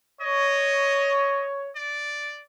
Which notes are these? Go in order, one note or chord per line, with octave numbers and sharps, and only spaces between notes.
C#5 D#5
D5